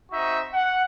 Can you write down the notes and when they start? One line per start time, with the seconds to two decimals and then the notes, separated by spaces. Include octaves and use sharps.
0.11 C4 D#4 F#4 E5
0.53 F#5